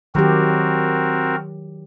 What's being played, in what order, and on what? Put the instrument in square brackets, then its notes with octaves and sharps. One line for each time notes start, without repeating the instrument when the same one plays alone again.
[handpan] D#3 F#3 G4 [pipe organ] C4 F#4 A#4